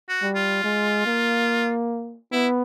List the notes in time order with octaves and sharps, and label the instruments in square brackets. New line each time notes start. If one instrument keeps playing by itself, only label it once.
[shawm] F#4
[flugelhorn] G3
[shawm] F4
[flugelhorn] G#3
A#3
[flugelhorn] B3 [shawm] E4